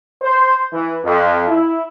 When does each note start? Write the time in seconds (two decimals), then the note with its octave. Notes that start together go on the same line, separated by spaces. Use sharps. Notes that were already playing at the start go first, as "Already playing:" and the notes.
0.22 C5
0.73 E3
1.04 F2
1.48 E4